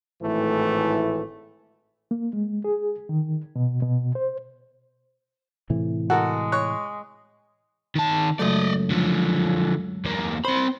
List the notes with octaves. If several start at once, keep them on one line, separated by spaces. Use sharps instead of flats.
G#1 A2 E3 A3
A#3
G#3
G#4
D#3
B2
B2
C5
A2 C3 E3
G#3 F#4 A4 A#4 F#5
C#5 F#6
D#3 A5
C#2 F#2 A3 D5 D#5
D3 F3
E2 A#3
C4 C5 B5